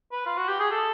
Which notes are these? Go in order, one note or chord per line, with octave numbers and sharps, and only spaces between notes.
B4
F4
F#4
G4
G#4
A4